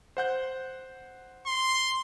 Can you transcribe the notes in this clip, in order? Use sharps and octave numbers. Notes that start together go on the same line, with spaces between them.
C5 F#5 G6
C6